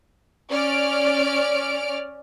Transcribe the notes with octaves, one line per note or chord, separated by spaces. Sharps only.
C#4 D5 F6 D7